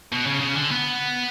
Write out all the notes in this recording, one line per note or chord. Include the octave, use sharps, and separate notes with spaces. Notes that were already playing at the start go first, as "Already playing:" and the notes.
B2
C#3
C#3
D3
B3